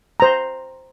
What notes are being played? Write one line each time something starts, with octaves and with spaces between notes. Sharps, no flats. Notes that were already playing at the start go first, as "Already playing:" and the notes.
C5 A#5